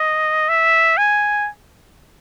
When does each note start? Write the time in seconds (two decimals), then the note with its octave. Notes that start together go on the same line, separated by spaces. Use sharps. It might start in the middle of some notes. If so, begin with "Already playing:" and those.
Already playing: D#5
0.49 E5
0.98 G#5